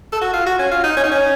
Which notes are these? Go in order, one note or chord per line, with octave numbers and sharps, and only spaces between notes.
A4
F#4
F4
F#4
C#4
F4
D#4
C#4
D#4
C#4